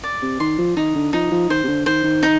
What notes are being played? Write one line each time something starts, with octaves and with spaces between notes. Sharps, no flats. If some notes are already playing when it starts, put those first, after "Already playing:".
D5
C3
D#3 C6
F3
D#3 D#4
D3
F3 D#4
F3
D#3 C5
C3
D3
D#3 C5
D#3
D#4